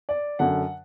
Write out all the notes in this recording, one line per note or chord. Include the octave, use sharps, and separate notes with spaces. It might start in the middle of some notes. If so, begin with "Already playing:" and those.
D5
F#2 D3 F#5